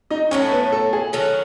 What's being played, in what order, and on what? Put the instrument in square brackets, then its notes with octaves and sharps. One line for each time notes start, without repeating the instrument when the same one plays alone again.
[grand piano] D#4 D#5
[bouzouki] A2 F#3 A3 E4 [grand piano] C#4 C#5
[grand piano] B3 B4
A4
G#4
[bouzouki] D#3 F#3 C#4 F#4 [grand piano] A4